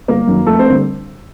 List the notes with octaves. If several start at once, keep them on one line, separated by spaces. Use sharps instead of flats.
G1 A#3 A#4
F#2 D#3
F2 A3 A4
C4 C5
D3 G3 A#3